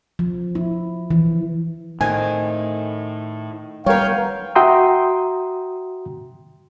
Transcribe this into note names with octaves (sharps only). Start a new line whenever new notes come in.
F3
E4
E3
A2 D#3 C4 F4 G#5
F#3 G3 B3 A#4 C#5 F5 G5
F#4 E5 G5 A#5 C6 D#6